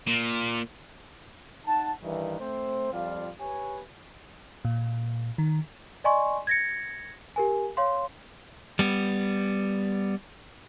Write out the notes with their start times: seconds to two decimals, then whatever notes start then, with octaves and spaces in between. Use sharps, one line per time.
0.08 A#2
1.66 D#4 F#5 A5
2.03 G2 D#3 E3
2.39 A3 C4 C5
2.92 F2 G3 F4 D5 F5
3.40 G4 B4 C#5 G#5
4.65 A#2
5.38 D#3
6.04 D5 D#5 G#5 C6 C#6
6.47 G#6 A#6 C#7
7.36 G4 A#4 G#5
7.77 C#5 F5 C6
8.79 G3 B3